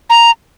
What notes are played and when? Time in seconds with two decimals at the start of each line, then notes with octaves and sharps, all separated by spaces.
0.10 A#5